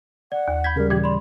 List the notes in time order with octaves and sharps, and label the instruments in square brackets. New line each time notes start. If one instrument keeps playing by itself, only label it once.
[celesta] D5 [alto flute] F#5
[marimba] D#2
[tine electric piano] B5 G6 G#6 [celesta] B6
[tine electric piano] C#3 G3 [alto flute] A#4
[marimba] A#2 E3 [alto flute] G4 [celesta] G#6
[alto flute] D5 [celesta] B5 C6